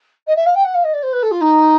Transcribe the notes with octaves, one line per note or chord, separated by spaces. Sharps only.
D#5
E5
F5
G5
F#5
F5
D#5
D5
C5
B4
A4
F4
D#4